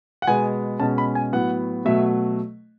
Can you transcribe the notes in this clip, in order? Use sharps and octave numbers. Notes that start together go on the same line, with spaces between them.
F#5
B2 G#3 B3 G#5
B2 G#3 C#4 A5
B5
G#5
A2 F#3 B3 F#5
B2 F#3 A3 E5